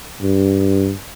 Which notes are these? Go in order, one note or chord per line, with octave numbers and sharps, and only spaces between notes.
G2